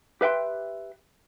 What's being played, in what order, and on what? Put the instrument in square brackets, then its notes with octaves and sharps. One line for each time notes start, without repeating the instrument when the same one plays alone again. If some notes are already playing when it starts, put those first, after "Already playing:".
[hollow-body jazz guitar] G4 B4 E5 G5 C6